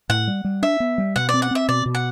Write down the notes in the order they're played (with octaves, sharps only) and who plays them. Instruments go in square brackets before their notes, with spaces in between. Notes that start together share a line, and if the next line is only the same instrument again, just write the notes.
[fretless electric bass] A2 [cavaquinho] F#5
[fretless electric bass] G3
G3
[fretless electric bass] D4 [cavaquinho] E5
[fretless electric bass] B3
G3
[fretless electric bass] B2 [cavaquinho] F#5
[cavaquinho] D5
[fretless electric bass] C4
[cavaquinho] F#5
[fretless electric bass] C4 [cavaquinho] E5
[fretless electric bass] B2 [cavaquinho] D5
[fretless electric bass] B2
[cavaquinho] F#5